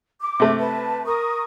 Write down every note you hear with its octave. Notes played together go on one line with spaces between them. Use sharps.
D6
C3 A3
B4 A5
A#4 C#6 D#6